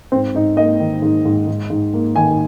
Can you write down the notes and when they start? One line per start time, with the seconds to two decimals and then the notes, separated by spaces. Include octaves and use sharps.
0.12 G#2 C4
0.35 G#2 D#4
0.57 A#3 D#5
0.80 D#3
1.02 G#2
1.25 G#2
1.47 G#2
1.70 G#2
1.94 A#3
2.16 D#3 G#5